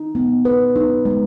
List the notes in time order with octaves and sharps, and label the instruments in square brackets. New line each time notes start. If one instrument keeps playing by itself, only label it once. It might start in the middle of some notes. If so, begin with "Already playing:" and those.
Already playing: [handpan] D#4
B3
B4
D#4
G#3